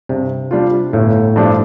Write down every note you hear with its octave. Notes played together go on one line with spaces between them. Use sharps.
G2 C3
G3 D4 F4
G1 A2
G2 F3 D4 F4